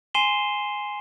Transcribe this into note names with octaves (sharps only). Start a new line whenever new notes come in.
G#5 C6 C7 D#7 E7 G7